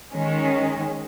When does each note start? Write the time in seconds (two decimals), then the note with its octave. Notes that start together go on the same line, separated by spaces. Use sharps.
0.14 D#3 G#3 C#4